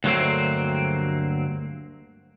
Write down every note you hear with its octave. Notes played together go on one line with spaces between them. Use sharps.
D2 G2 F#3 A3 A#3 C4